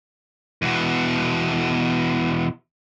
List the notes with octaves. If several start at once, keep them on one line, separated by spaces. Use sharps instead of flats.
E2 B2